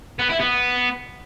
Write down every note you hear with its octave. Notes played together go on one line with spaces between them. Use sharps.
B3
E4
B3